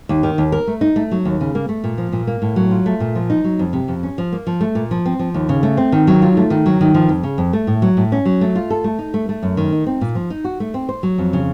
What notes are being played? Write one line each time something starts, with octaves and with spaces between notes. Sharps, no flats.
D#2
D#3
D#2
A#4
A3
D#4
A3
F#3
D#2
C#3
A#3
A3
A#2
F3
A#2
A#3
A2
F#3
F4
A3
A#2
F3
D#4
F#3
F2
C3
F2
C#4
F3
A#3
F3
A3
A#2
F3
C4
F3
D#2
C#3
A3
C4
D#3
F#3
F4
A3
D#3
F#3
D#3
F3
F2
C#3
F2
A3
A2
F#3
A2
C#4
F#3
A3
F4
A4
A3
D#4
A3
A3
F#2
D#3
D#4
C4
A#2
F3
D#4
F#4
A3
C4
C5
F#3
F2
C#3